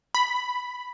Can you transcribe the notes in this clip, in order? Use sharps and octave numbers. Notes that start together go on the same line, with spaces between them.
B5